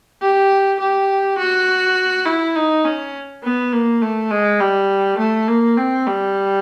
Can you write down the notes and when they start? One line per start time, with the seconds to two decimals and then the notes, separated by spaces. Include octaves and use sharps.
0.22 G4
0.80 G4
1.39 F#4
2.26 E4
2.56 D#4
2.85 C#4
3.44 B3
3.73 A#3
4.02 A3
4.31 G#3
4.60 G3
5.19 A3
5.48 A#3
5.77 C4
6.07 G3